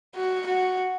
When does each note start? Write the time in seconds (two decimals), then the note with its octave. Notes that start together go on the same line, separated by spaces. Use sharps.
0.15 F#4
0.46 F#4